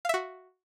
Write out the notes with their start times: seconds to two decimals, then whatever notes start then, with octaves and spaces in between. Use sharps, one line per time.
0.05 F5
0.09 E5
0.14 F#4